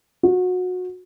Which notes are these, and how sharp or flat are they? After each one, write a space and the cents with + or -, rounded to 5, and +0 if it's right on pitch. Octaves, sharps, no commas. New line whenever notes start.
F#4 -25